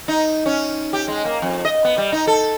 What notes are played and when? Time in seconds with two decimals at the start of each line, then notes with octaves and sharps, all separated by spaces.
0.08 D#4
0.46 C#4
0.93 G4
1.08 G#3
1.25 A#3
1.42 F2
1.65 D#5
1.85 B3
1.98 G3
2.12 D#4
2.27 A4